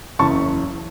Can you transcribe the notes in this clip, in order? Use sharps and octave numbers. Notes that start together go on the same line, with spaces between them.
F#1 E2 C#3 E3 A5 C#6